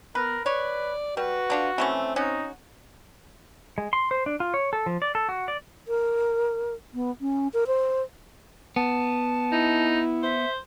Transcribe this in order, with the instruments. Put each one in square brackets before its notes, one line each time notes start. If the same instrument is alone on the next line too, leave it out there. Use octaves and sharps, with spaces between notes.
[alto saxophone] B3 [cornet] A#4 [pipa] B4
[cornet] B4 [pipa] C#5 [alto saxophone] D5
[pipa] G3 [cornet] F#4 [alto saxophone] B4
[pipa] D3 D4 F4
[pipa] E3 A3 C#4 [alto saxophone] C4
[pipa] C#4 F#4 [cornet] D#4
[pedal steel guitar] G#3
C6
C5
D4
F4
C#5
A4
F3
D5
A4
F#4
D5
[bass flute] A#4
B3
C#4
A#4
C5
[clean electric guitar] B3 [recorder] A5
[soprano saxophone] D#4 [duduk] E4
[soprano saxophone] C5 [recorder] E5